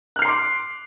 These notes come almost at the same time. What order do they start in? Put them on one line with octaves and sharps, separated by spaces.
F#6 F6 C7 C6 D6